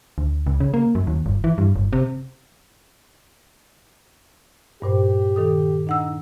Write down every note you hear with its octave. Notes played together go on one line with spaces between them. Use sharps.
D2
C#2
C#3
A#3
F#2
D#2
G1
E3
G2
G1
C3
G2 A#2 G4 C5
D#3 A4 D#6
D4 D#4 F#5 E6